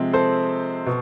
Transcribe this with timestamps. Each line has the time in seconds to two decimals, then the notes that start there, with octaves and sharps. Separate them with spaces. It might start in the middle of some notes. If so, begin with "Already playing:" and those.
Already playing: C3 F3 G#3 C4
0.13 A4 C5
0.86 B2